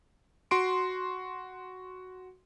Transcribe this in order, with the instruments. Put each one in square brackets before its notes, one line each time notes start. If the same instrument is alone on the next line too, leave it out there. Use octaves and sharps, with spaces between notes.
[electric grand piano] F#4 C6 D7